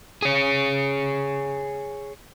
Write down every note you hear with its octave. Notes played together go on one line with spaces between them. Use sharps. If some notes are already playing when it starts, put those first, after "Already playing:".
G#4 C#5